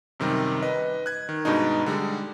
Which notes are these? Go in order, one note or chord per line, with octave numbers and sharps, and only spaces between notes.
F#2 C3 D#3 G3
B4 D#5
F#6 G#6
D#3
G2 B2 G#3 D4 D#4
D3 G3 G#3